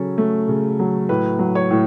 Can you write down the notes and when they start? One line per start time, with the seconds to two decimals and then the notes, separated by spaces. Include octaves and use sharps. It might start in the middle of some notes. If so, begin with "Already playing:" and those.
Already playing: C#3 F#3 C#4 A4
0.18 A3
0.48 C#3
0.79 F#3
1.09 A2 B4
1.39 F#3
1.55 C#5
1.71 A2